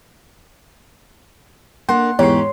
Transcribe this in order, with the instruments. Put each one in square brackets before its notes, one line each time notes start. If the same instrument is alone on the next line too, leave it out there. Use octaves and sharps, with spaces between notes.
[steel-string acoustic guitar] A#3 D4 [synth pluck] F#5 [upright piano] C6
[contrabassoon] E2 [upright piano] G#2 [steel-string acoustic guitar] G4 [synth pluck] C#5 C6